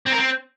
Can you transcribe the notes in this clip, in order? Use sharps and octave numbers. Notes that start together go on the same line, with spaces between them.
C4
A#4
C4